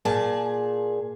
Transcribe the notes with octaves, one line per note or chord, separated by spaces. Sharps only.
A#2 G#4 A5